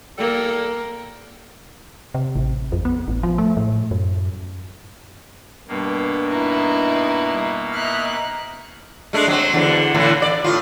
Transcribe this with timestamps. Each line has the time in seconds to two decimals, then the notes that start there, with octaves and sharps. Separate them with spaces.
0.18 E2 G3 A#3 A4
2.15 C3
2.36 A1
2.72 F2
2.85 B3
3.08 A1
3.23 F3
3.38 A3
3.57 A2
3.91 F#2
5.68 G2 B2 A#3
6.28 D#4 E4
7.72 D#4 E5 F6 F#6
9.13 G#3 A3 D4
9.28 F#3 C4
9.54 E2 D3
9.95 A2 D3 E3
10.22 D5
10.44 A2 F4